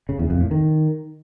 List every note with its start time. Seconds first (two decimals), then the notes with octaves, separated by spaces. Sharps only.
0.09 C#3
0.19 E2
0.30 F2
0.40 A2
0.51 D#3